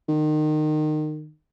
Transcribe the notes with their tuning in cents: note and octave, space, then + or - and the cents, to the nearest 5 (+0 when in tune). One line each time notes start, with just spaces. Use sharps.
D#3 -25